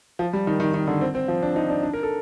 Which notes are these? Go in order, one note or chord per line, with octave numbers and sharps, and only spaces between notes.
F3
G3
D#3
D#3
D#3
D3
C4
C4
F3
D4
D#4
D4
D4
A#4
A4